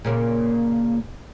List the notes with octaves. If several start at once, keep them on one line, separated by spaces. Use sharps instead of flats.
A#2 C#3 A#3